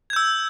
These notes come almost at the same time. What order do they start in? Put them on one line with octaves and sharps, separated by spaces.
G#6 G6 E6